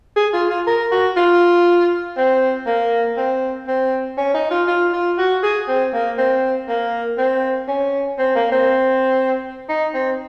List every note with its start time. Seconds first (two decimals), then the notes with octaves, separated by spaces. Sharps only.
0.16 G#4
0.33 F4
0.50 F4
0.67 A#4
0.92 F#4
1.16 F4
2.17 C4
2.67 A#3
3.17 C4
3.67 C4
4.18 C#4
4.34 D#4
4.51 F4
4.67 F4
4.93 F4
5.18 F#4
5.43 G#4
5.68 C4
5.93 A#3
6.18 C4
6.68 A#3
7.18 C4
7.68 C#4
8.19 C4
8.35 A#3
8.52 C4
9.69 D#4
9.94 C4